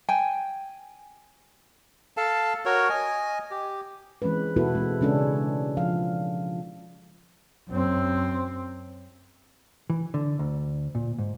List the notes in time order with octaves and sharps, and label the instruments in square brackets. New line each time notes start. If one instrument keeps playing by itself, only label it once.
[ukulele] G5 G#5
[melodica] A4 F5 A5
F#4 A#4 C#5
D#5 G#5
G4
[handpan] E3 G#3 C4 C#4 B4
B2 B3 E4 F#4 A4 B4
G#3 C4
C#3 G#3 C#4 D4 A4
F3 F5
[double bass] F#2 C4
[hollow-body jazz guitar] E3
D3
D2
A#2
G#2